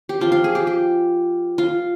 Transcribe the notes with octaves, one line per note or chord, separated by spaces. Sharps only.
G4
F3 C4 F4
F4
G#4
G4
G4
F4